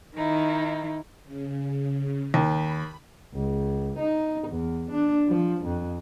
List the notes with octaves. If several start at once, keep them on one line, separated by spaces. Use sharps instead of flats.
D#3 D#4 E4
C#3
D#2 B5
C#2
D#4
E2
D4
F3
F2